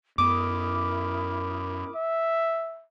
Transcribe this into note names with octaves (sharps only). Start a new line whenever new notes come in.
F#2 B3 E4 A#4 B5 D6 D#6
E5